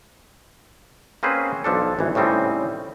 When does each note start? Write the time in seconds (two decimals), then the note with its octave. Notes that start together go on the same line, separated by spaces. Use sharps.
1.23 A#3 C4 C#4 G#4 B4 C5
1.64 B1 F3 D4 A4
1.99 G#1 G2 E3
2.15 A2 C#3 G3 C4 D#4